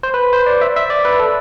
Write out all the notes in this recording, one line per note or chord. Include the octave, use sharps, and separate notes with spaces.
C5
B4
C5
D5
E5
E5
D5
B4
A4